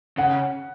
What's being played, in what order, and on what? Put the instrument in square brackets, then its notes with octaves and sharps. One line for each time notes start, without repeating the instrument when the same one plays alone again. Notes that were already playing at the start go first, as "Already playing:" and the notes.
[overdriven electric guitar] C#3 [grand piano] F#5